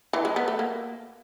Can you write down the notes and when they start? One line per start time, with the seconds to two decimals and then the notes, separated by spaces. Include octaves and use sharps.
0.13 E3
0.25 G#3
0.36 B3
0.48 A3
0.59 A#3